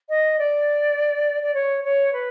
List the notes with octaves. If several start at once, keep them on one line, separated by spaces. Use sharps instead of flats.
D#5
D5
D5
C#5
C#5
B4